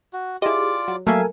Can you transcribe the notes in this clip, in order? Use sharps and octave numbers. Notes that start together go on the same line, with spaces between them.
F#4
E4 F4 G4 G#4 D5 D#5 D6
F#3
F#3 A3 A#3 A4 A#4 E5 F5 G#5